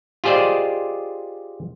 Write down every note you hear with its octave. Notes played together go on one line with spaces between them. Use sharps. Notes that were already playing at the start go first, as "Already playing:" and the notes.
F4 G4 G#4 C5 D5 D#5